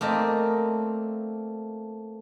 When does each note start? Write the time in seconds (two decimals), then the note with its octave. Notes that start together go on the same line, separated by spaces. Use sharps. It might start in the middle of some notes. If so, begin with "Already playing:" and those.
0.01 A3 A#3 C4 D5 D#5